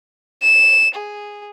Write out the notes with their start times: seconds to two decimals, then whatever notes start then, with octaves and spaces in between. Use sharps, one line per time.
0.42 E7
0.95 G#4